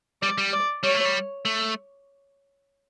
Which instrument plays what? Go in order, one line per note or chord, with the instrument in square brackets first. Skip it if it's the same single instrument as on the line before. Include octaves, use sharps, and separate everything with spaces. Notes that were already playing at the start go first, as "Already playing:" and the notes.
[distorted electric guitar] G3 [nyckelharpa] D5
[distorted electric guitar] G3
[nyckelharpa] D5
[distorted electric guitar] G3 [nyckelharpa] C#5
[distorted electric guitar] A3
G3
A3